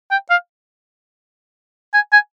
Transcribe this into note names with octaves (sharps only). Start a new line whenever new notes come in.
G5
F5
G#5
G#5